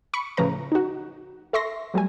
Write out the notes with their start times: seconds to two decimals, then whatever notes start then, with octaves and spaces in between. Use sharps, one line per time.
0.13 B5 C#6 C#7
0.37 A2 C#3 F3 B4 A#5
0.72 D#4 F#4
1.53 A4 E5 C6 C#6 A#6 C7
1.94 F#3 G3 A3 G#5